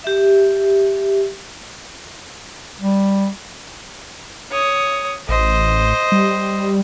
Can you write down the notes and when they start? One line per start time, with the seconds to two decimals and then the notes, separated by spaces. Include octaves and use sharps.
0.04 G4 E5
2.81 G3
4.52 C#5 D#6
5.29 A1 C5 D#5
6.12 G3